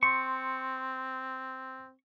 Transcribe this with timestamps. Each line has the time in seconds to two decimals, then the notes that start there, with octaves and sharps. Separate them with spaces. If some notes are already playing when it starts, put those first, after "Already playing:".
0.03 C4 C6 C#6